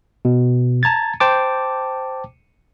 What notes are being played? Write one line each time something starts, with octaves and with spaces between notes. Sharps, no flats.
B2
A5 A#5 G#6 A6
C5 G5 A5 D6